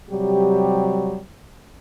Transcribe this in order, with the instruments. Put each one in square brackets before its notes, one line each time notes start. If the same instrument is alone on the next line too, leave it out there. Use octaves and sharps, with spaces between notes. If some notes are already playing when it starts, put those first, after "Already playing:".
[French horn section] C3 F#3 G3 G4